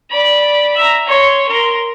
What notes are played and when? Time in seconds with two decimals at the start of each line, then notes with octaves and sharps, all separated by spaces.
0.11 D5 B5
0.76 E5 A#5
1.07 C#5 C6
1.48 A#4 C6